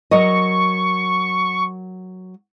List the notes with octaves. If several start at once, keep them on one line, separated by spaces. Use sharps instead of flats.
F#3 A#4 D#5 C#6